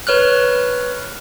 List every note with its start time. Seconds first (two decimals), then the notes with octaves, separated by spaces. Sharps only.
0.07 B4 C#5 F6 F#6